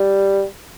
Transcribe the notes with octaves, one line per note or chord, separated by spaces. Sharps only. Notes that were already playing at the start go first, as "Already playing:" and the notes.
Already playing: G3